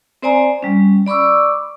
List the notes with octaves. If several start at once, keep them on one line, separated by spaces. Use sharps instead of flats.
C4 C5 D5 G#5 A#5
G3 C#4
D5 B5 C#6 D6 E6